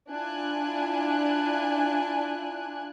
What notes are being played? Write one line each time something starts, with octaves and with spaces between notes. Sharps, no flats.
D4 E4 F4 G#5 F#6